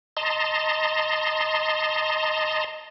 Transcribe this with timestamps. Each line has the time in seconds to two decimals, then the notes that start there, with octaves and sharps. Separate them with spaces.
0.17 D#5 A5 A#5 C6